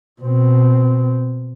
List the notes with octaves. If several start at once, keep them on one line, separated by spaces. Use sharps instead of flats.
B2 C4